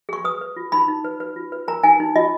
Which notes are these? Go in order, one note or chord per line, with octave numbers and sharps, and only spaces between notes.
G#4 C#6
B4 D#6
B4
F4
D#4 B5
D#4
B4
B4
F4
B4
A#4 A#5
D#4 G#5
D#4
F4 D#5